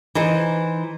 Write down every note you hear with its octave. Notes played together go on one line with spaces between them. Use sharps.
E3 D#4 C5